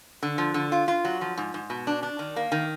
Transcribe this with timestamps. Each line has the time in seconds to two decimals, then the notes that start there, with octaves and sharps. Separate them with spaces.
0.23 D3
0.38 F3
0.54 D3
0.72 F4
0.88 F4
1.05 F#3
1.21 F3
1.38 G#2
1.54 G#2
1.70 B2
1.87 D4
2.03 D4
2.19 D#3
2.36 A#3
2.52 D#3